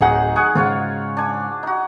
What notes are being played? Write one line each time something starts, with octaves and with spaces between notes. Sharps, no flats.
D1 D#3 F#3 D#4 G#4 F#5
G#4 F#5 G#5 C#6 D#6
G#2 C#3 F4 F#4 C#5
D4 G#5 D6
D#4 F#4